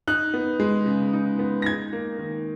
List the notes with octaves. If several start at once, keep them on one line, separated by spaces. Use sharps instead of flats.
D#4 F#6
B3
G#3
C#3
D#4
B3
A#6
D#4 G#6
A#3
D#3